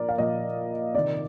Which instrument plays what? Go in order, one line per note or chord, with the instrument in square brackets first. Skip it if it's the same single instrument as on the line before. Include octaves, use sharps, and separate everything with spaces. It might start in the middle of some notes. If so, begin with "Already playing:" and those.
Already playing: [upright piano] A#2 F3 A#4 D5
F5
A#2 F3 D#5
C3 D#3 D5